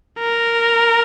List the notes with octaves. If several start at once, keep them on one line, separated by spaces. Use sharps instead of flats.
A#4